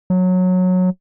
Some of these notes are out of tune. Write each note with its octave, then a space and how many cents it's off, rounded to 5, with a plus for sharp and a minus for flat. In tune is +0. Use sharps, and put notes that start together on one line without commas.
F#3 -15